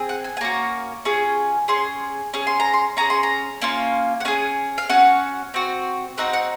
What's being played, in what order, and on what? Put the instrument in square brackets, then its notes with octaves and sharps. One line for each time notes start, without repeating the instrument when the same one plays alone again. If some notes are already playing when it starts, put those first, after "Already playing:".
Already playing: [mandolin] C4 G#4
F#5
G#5
G#5
A#3 C#4 F#4 A#5
C#4 F4 G#4
C#4 G#4 C6
C#4 G#4
C6
A#5
C6
C#4 G#4 A#5
C6
A#5
A#3 C#4 F4
F#5
C#4 G#4 G#5
F5
C#4 F#4 F#5
C4 F#4
C4 D#4 F#4 F#5
F#5